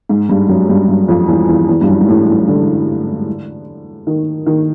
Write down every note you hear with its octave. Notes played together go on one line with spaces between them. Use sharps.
G#2
G2
F#2
G2
G2
F2
E2
E2
E2
G2
F#2
G#2
A2
A2
D3
D#3
D#3